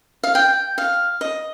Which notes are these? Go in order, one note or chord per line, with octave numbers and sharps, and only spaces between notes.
F5
G5
F5
D#5